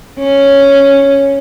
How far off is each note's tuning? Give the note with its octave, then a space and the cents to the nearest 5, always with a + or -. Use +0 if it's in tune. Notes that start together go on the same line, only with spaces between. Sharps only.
C#4 +0